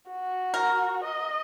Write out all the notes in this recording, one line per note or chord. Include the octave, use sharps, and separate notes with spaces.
F#4
A#4
D#5